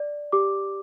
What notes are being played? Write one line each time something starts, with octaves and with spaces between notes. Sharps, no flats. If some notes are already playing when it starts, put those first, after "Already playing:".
Already playing: D5
G4 D6